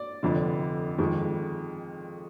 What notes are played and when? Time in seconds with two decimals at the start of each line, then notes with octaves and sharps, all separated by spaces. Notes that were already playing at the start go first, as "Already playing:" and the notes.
Already playing: D5
0.23 F1 F2 D3
0.99 F2 D#3 G#3